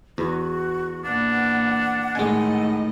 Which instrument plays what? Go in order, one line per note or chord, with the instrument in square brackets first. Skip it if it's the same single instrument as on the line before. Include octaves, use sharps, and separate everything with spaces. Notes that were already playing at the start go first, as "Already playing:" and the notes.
[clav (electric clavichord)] E2 [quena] F#4
[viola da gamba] A#2 E3 [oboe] D4 [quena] F#5
[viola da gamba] A2 D#3 D#5 [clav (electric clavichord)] G#3 G#5